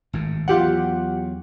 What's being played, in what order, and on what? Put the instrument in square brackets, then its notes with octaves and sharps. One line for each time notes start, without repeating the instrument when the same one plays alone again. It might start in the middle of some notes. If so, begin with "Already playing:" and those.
[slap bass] G#1 A2
[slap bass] E2 F#3 [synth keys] F4 G4 F#5